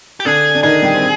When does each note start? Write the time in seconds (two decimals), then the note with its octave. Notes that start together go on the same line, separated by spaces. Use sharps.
0.20 G4
0.25 D3 D4 G#4
0.55 D4
0.63 D#3 D#4 G#4
0.82 G3 G4
0.95 C4